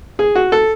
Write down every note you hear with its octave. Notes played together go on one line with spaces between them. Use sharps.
G#4
F#4
A4